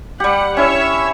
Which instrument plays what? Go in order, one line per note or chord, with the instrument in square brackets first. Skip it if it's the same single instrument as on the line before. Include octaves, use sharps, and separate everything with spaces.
[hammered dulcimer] G3 G4 [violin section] F#5
[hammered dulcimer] C#4 E4 [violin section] C#5 E5 E6